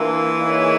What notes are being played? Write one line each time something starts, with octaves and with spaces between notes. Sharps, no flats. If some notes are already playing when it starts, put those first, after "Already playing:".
Already playing: E3 A#3 D4 F4
A#3 D#4 G#4 C#5 E5